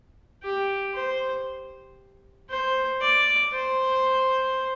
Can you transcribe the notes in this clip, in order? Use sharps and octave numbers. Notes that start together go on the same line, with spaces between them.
G4
C5
C5
D5
C5